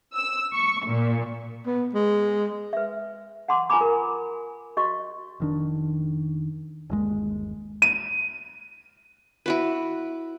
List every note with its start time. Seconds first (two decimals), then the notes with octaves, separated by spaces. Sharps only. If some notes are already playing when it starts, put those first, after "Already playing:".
0.14 E6
0.54 C#6
0.86 A#2
1.66 B3
1.94 G#3
2.73 B4 E5
3.48 F#5 A5 C6 D6
3.70 F4 B4 G#5 A#5 B5 D6
3.81 A#4
4.77 F#4 D#5 C#6
5.40 F1 D#3 D4
6.90 G1 D#2 G#3
7.82 D#7
9.46 E4 F#4 B4